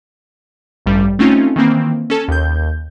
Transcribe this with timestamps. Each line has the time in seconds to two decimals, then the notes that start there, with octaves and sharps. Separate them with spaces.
0.86 A1 G2 G3
1.19 A3 C4 C#4 D#4 F4
1.56 D#3 E3 A#3 C4
2.10 C#4 A4 A5
2.28 D#2 G6